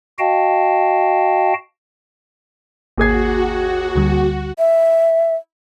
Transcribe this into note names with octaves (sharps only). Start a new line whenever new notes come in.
F#4 D#5 F5 G5 A5
G#1 D#2 F#4 G#4 G#6 C7
D2 D3 G3
E5